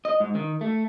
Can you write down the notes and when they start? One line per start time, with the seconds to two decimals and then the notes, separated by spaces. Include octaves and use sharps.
0.05 D#5
0.20 G#2
0.35 D#3
0.61 A3